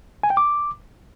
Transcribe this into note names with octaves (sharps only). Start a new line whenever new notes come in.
G#5
G5
D6